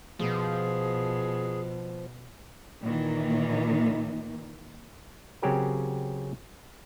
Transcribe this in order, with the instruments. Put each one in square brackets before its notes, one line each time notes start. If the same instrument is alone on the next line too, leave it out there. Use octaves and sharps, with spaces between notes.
[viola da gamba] B2 [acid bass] F3 [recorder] G#4
[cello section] A#2 D#3 E3 A#3
[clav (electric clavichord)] C#3 F#3 C4 C#4 G4 A#4